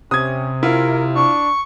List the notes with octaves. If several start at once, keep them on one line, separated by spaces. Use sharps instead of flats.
C3 C#4 D#6 G#6
E4 F4 A#4
D4 C#6